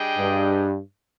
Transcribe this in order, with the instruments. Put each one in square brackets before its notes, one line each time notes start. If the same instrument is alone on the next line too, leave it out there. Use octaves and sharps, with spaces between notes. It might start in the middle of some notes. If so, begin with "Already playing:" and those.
Already playing: [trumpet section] G3 D4 G#4 D#5 G5
[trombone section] G2